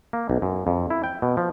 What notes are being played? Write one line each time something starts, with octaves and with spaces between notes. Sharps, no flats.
A#3
B1
F#2
F2
E4
G5
B2
F3